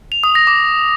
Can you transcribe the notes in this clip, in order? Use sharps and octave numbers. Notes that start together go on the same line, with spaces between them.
F7
D#6
A#6
D6